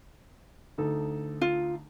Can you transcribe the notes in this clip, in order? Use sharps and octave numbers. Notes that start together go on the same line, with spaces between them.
D2 D#4 A4
F4